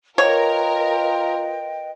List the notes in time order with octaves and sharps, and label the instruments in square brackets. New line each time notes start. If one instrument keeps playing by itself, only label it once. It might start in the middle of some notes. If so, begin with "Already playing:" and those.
[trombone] F4 [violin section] A#4 [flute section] B4 D#5 G5 [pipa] C#5